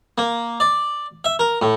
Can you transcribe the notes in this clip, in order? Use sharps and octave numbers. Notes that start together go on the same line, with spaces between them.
A#3
D5
E5
A#4
A2